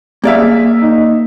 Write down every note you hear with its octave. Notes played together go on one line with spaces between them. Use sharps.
A#3 G#4 D5 E5 F5
D#4